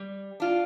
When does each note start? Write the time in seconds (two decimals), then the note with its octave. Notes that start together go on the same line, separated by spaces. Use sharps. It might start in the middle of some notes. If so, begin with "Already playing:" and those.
Already playing: G3
0.40 D4 F4